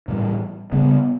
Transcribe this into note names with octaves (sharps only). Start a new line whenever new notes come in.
A2 E3 G3
C#3 G3 B3